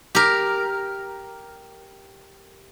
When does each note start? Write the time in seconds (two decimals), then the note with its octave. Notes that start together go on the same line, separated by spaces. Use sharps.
0.15 G4 A#4